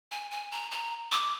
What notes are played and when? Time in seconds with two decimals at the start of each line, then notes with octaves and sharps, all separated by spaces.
0.11 G#5
0.31 G#5
0.51 A#5
0.71 A#5
1.12 D6